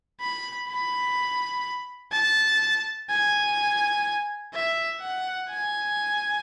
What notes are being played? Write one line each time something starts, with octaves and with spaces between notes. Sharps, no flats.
B5
B5
A5
G#5
E5
F#5
G#5